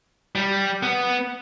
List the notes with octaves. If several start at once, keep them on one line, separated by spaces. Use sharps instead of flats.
G3
B3